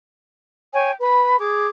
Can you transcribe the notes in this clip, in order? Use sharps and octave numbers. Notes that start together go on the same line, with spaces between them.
C#5 G5 G#5
B4 B5
G#4 D6